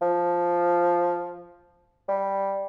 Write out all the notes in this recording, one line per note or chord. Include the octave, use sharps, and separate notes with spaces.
F3
G3